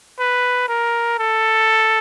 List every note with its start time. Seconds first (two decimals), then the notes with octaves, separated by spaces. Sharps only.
0.19 B4
0.69 A#4
1.19 A4